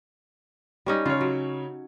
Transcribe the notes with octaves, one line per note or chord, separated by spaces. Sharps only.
G3 C#4 D#4
C#3 F4 C#5
F#3